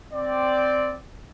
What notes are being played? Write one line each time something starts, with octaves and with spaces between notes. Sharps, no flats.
C4 D5